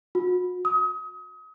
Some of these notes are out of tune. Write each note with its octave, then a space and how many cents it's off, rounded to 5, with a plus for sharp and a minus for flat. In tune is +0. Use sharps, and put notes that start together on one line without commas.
F#4 -40
D#6 +35